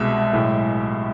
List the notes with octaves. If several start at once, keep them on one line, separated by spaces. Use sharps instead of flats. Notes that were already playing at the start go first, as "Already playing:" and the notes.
Already playing: C2 B2 G#3 E5
B1 A2 G#3